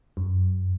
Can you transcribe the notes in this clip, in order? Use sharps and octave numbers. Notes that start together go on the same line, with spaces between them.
F#2